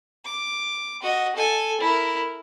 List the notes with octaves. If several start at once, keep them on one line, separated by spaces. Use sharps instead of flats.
D6
F#4 D#5
A4 G#5
E4 A#4